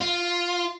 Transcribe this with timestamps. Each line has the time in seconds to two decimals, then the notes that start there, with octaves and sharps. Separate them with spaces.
0.01 F4